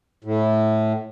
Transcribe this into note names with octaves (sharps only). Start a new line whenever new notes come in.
A2